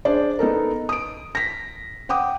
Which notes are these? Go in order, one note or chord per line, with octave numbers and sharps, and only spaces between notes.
D4 G#4 C5 D5
B3 D#4 A4 A#4
D#6 D7
A#6 B6
F#5 G5 D6 D#6